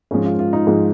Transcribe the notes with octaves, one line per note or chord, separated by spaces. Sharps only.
G#2 F3 G#3 C#4
F4
F4
D#4
G#2 F3 G#3